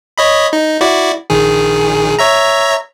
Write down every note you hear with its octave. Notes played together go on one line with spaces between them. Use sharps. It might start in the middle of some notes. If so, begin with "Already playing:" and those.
C#5 D#5 B5
D#4
E4 F#4 D5
A#1 D#3 G#4
C#5 E5 A#5